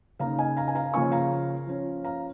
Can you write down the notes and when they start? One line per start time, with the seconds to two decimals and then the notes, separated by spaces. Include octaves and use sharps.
0.19 C#3 A#3 D#4 F5 A#5
0.38 D#5 G#5
0.57 F5 A#5
0.68 G#5
0.75 F5 A#5
0.94 C#3 F3 A#3 C#4 G#5 C#6
1.12 F5 A#5
1.67 F3 C#4
2.04 F5 A#5